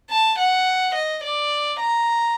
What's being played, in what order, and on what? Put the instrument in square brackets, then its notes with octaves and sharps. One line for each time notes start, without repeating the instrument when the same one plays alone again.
[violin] A5
F#5
D#5
D5
A#5